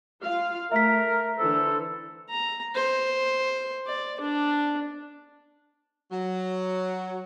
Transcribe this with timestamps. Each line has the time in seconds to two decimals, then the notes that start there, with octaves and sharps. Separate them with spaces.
0.21 F4 F5
0.72 A3 A#4 E5 B6
1.39 D3 E3 A4 C5
2.29 A#5
2.75 C5
3.86 D5
4.20 D4
6.11 F#3